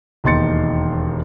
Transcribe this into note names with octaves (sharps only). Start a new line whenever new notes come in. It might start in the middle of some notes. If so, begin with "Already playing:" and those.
E1 D#2 D#4 C6 A6 C#7